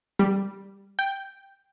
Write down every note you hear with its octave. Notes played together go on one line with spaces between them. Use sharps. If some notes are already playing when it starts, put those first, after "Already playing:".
G3
G5